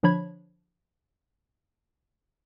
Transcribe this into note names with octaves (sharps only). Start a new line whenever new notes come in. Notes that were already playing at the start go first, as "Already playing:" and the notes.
D3 F3 D4 C#5 B5 G#6